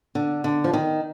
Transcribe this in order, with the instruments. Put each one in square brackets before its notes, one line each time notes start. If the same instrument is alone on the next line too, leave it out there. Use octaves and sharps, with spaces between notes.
[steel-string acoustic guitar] D3
D3
F3
D#3